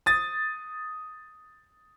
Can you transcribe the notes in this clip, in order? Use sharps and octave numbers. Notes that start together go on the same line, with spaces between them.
D#6 A6